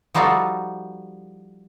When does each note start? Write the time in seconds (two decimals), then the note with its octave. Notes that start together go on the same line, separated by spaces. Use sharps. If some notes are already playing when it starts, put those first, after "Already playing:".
0.15 F3 G3 D#4 F4 F#4 A4